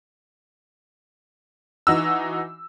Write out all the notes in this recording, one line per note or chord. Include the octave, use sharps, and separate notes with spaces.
E3 D#4 F#4 E6